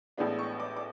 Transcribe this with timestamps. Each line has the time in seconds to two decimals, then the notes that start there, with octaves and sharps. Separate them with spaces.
0.17 A1 A2 G#3 B3 D4
0.39 C#6
0.60 D6
0.76 D6